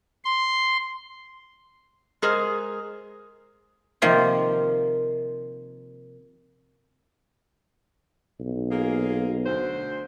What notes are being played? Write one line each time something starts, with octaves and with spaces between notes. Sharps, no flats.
C6
G#3 G#4 A#4 C5
C3 D#3 F3 A#3 F4 G4
B1
A#3 F4 G#4
D2 C5